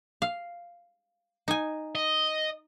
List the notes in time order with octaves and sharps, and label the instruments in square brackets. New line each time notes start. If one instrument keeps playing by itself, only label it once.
[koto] F5
D#4 G#5
[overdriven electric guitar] D#5